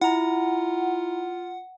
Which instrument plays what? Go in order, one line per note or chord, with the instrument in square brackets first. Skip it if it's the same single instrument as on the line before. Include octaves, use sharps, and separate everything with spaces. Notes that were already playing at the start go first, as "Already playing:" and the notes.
[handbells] E4 A#5 [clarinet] F4 [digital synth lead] F#5